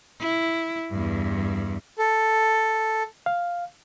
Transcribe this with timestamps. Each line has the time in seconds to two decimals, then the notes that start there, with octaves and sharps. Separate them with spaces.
0.20 E4
0.91 E2 G2
1.98 A4
3.26 F5